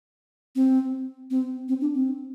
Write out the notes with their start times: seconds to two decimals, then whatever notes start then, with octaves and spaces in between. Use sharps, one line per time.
0.56 C4
1.31 C4
1.69 C4
1.81 D4
1.94 C4